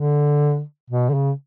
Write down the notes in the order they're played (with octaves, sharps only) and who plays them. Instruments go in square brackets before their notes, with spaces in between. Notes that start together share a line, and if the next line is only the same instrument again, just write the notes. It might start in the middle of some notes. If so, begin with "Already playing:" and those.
Already playing: [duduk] D3
B2
D3
C#3